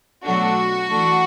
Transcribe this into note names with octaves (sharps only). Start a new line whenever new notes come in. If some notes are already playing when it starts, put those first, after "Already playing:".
B2 F#3 A3 D4 F#4
E3 A3 D4